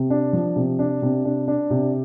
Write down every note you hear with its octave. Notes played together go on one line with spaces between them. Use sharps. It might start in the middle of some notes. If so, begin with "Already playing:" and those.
Already playing: C3
D4
F3
C3
D4
C3
D4
D4
C3